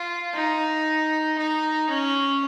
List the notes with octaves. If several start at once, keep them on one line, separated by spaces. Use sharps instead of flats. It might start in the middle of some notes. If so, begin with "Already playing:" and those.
Already playing: F4
D#4
D#4
C#4